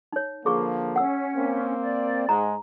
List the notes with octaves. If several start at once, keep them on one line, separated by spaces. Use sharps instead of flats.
D#4 C#5
D3 F3 A#3 G#4 C#6
C#4 F#5 E6
A#3 C4
D5
G#2 G#3 A#5